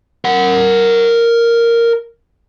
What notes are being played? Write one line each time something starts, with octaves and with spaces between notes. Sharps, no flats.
A#4 F#5